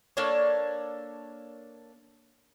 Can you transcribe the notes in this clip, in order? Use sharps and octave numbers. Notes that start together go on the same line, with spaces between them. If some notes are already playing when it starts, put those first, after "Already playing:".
A#3 D4 A4 C#5